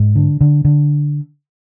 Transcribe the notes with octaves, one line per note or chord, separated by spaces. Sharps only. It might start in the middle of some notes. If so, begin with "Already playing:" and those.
Already playing: G#2
D3
D3
D3